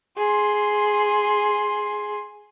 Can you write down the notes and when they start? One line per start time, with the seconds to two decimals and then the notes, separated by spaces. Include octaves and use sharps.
0.18 G#4 C6